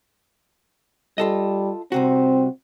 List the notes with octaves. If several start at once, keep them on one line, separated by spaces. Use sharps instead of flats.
G3 F4 A4 D#5
C2 C3 C4 F#4